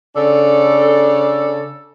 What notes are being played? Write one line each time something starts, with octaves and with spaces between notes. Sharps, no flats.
C#3 D4 A4